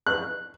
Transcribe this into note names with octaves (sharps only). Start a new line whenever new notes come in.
F#6